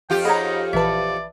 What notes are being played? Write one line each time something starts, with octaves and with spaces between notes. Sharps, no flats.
F2 F4 G4 G5
D#4 G#4 C#5 D#5 F#5 A#5 B5
A#1 E3 B4 D5 E5 A5